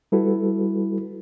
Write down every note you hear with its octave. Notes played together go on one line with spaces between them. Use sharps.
G3 E4 F#4 A4 B4